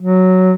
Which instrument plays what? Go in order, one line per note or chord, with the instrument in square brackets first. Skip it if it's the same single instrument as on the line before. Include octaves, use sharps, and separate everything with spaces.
[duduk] F#3